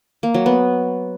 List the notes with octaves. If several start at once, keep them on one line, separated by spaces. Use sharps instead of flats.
A#3
F#3
B3